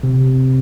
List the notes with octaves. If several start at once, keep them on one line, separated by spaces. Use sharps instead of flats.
C3